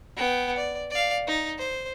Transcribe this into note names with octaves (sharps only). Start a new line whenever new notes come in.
B3 G5
D5
D5 F5
D#4
C5